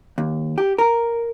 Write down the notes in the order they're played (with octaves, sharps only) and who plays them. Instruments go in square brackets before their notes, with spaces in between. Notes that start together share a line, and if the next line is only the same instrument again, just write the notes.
[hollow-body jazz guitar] D#2
G4
A#4